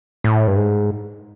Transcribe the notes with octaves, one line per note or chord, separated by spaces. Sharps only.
A2
G2
G#2